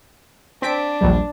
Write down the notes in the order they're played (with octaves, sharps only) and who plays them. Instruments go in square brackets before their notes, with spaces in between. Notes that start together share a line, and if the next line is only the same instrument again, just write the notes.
[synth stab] C4 B6 D7 [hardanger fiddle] D4
[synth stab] A#1 D#2 G3